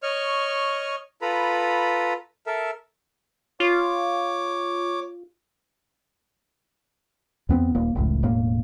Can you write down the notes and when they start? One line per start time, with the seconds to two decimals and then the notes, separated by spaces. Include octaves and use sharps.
0.03 C#5 D#5 C#6 F6
1.22 F4 A4 B4 A#5 B5
2.46 A4 A#4 E5
3.60 F4 C#5 D6
7.49 E2 B3 C4
7.75 D#1 A#3
7.95 F1 C#2 A2
8.23 E1 A2 A#3